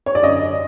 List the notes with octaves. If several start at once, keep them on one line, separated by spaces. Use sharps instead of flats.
C#5
D5
F#2 D3 D#5